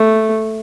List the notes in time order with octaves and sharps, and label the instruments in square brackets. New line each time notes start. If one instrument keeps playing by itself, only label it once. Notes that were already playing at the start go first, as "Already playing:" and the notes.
Already playing: [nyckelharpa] A3